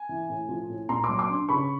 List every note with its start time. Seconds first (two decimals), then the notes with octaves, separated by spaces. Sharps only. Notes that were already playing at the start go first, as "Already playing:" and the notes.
Already playing: G#5
0.09 E3
0.29 A2
0.49 F3
0.69 A2
0.89 A#2 A#5 C6
1.04 C6 D6
1.09 F#3
1.19 C6 D6
1.29 D4
1.49 C#3 B5 C#6